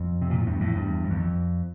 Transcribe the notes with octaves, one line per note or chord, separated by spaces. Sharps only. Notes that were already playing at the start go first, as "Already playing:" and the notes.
Already playing: F2
C3
A#2
A2
E2 G2
F2 A2
E2 G2
F2
E2
F2